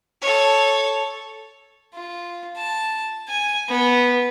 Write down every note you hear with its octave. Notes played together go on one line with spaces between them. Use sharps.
A4 C#5
F4
A5
G#5
B3